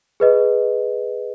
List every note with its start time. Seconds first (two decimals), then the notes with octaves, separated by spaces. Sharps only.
0.20 G#4 B4 D#5